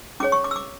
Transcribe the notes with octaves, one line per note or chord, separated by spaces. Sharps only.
C#4 G#4 C#5 D6
C#6
D6
E6
D6